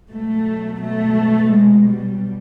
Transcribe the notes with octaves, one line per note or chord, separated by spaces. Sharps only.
B2 F#3 A3
A3
G#3
G3